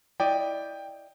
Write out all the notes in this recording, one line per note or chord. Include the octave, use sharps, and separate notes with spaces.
E4 D5 D#5 G5